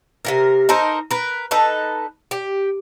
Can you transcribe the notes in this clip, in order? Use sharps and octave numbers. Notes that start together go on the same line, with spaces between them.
C3 D#3 A#4
D#4 A4 A#4 C5
A#4 B4
D#4 A4 B4
G4